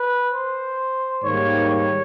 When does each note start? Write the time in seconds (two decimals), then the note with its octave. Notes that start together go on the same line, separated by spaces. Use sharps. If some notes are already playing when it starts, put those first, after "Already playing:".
Already playing: B4
0.29 C5
1.22 G#2 D#3 G3 A#3 C#5
1.69 C#5